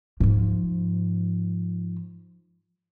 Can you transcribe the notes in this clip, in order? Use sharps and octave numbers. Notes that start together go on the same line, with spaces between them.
G#2 F3